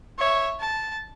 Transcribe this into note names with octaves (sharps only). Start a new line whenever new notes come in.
C#5 E5
A5